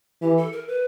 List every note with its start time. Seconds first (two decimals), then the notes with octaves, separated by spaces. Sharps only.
0.22 E3 G4
0.37 A4
0.52 A#4
0.68 B4